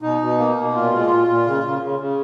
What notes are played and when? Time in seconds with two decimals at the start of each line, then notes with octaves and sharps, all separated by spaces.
0.02 B2 D#4
0.21 B2
0.38 A#3
0.57 B2
0.74 A#2 F4
0.93 G#3
1.10 A#2
1.28 A#2
1.46 C#3
1.64 C#3
1.82 C#3
1.99 C#3